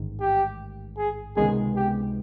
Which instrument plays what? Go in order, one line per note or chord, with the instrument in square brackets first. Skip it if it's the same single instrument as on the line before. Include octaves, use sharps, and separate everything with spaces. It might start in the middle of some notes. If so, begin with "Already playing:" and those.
Already playing: [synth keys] A1 G#2 D#3
[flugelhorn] G4
G#4
[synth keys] C#2 C3 D#3 G#3 B3 [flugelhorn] G#4
[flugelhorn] G4